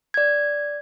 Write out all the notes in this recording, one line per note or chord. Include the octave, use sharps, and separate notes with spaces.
D5 G#6